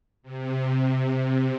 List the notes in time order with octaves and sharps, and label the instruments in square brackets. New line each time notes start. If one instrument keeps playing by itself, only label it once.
[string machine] C3